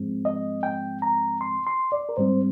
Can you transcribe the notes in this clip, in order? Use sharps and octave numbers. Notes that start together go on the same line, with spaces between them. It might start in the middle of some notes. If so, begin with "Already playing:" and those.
Already playing: G#2 F3 G#3 C4
D#5
G5
A#5
C6
C6
D5
A#4
G#2 G3 C4 C5